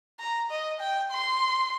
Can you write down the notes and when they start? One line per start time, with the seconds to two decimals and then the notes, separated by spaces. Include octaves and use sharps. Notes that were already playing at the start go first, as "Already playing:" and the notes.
0.20 A#5
0.51 D#5
0.80 G5
1.12 C6